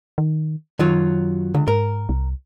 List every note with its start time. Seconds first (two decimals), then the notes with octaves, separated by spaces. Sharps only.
0.18 D#3
0.79 F#2 D#3 F#3 F4
1.55 C#2 D3
1.68 G#2 A#4
2.09 C2